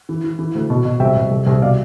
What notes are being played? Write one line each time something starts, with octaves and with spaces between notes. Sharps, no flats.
E3
E3
E3
D2
B2
B2
C2 E5 G5
C2
C2
C2
B2 D5 F5